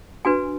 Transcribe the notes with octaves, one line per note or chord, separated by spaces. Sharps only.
D4 F#4 B4 G#5